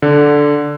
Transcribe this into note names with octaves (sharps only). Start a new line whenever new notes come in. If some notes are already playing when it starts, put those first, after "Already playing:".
D3